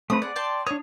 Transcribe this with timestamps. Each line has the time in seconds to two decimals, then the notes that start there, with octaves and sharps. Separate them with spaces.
0.10 A3 C4 B4 D#6
0.22 G#4 D5 F#5
0.36 G5 A5 C6
0.67 D4 C#5 D#6